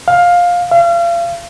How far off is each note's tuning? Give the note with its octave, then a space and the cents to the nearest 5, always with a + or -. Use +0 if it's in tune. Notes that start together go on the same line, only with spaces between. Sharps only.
F5 +15
F5 -35